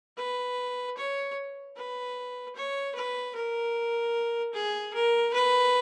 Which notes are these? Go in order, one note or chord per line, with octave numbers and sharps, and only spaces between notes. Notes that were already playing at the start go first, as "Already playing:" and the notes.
B4
C#5
B4
C#5
B4
A#4
G#4
A#4
B4